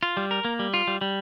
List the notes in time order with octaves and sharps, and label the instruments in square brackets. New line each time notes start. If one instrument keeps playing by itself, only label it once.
[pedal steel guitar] F4
G3
A#4
A#3
G3
F4
G3
G3